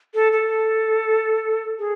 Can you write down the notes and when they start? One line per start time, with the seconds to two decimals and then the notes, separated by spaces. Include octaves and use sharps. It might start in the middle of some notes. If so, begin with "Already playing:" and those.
0.14 A4
0.32 A4
1.79 G#4